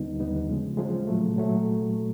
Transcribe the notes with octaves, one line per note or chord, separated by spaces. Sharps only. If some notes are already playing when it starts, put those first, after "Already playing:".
Already playing: D#2 D3 G3 B3 D#4
D#2 D3 G3 B3 D#4
C#3 F3 G#3
C#3 F3 G#3
A#2 F#3 A3
A#2 F#3 A3